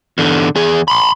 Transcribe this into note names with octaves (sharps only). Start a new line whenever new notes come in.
E2 D3
E2 G#4
B5 C6